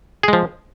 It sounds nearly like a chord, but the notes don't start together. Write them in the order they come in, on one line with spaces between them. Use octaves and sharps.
G#4 G#3 F3